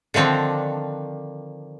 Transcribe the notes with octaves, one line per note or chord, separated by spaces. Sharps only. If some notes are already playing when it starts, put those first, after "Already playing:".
D3 D#3 F3 C4 D4